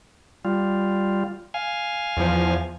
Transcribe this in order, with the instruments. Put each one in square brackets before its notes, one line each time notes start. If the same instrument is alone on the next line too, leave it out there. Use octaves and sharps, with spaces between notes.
[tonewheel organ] G3 F4
F5 G#5
[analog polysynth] E2 F3